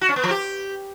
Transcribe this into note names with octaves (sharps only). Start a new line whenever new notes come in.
F#4
C#4
B3
F3
G4